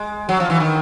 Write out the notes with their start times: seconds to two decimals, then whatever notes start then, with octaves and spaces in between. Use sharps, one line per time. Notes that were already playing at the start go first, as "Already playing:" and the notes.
Already playing: G#3
0.29 F#3
0.40 F3
0.50 E3
0.60 D#3